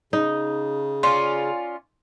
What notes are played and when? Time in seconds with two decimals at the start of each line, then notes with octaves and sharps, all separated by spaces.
0.13 C#3 D#4
1.03 C#4 F4 D5 C6